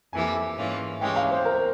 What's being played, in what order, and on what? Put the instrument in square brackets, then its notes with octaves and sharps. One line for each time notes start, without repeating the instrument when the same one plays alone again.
[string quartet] F2 E3 A#3 E4 G4 [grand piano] G#5
[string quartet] G#2 E3 A#3 C#4 F4
[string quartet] E3 G#3 C#4 G4 [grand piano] G5
[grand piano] F5
C5
A#4